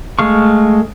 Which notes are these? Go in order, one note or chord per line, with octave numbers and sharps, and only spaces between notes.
G#3 A3 F5 C#6